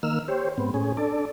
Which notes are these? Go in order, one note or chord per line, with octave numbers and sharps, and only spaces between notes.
D#3 A#3 E6 F6
G4 C5 C#5
G#2 B3 C4
A2 C#4 G#4
D4 A4 D5